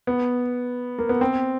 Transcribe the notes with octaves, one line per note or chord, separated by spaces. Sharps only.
B3
A#3
B3
C4